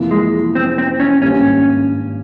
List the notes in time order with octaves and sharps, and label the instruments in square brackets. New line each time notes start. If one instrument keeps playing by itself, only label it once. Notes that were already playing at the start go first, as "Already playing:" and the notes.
Already playing: [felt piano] F2 C3 E3 A#3
[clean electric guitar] G#3
C4
C4
C#4
[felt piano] G#1 G2 G3 A#3 [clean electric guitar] C#4